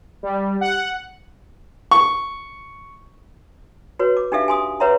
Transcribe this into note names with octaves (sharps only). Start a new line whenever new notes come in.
G3
F#5
C#6
F#4 B4 C#5
D6
D4 D#4 G4 A4 E5 F5
G#5 C6 D#6
B4 C#5 E5 F#5 A#5 C6